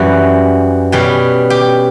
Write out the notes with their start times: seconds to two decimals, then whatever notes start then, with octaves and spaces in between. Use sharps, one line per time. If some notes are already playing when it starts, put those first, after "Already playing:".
Already playing: F#2 E3 G3 F#4
0.92 B2 G3 C#4
1.50 G4